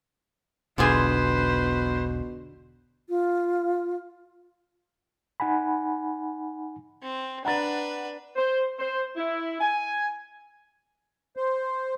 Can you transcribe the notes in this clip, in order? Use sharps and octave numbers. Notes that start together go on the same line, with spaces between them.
E1 B1 B2 D3 F4 G#4 B4 C5
F4
D#4 F#5 G#5 B5
C4
D4 B4 F#5 A#5 A6
C5
C5
E4
G#5
C5